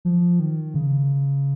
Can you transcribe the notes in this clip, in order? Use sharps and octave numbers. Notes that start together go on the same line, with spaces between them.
F3
D#3
C#3